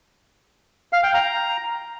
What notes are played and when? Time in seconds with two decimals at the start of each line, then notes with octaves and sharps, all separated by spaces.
0.93 F5
1.03 G5
1.14 A#5